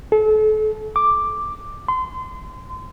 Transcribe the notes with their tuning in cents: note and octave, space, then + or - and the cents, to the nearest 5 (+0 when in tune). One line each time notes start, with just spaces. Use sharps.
A4 -35
D6 +5
C6 -30